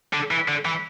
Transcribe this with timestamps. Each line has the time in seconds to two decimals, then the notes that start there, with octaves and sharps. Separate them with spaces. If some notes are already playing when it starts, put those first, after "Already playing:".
0.13 D3
0.31 E3
0.48 D3
0.65 E3